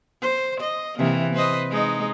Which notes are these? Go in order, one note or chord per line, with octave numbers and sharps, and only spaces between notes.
C5
D#5
C3 E3 A#3
B4 C5 D#5
G#3 D#4